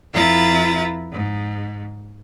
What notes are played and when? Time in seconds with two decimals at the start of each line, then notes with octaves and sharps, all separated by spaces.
0.12 F2 E4 F4 B4 A#5 A6
1.11 G#2